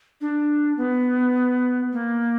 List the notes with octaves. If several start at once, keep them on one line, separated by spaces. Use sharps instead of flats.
D4
B3
A#3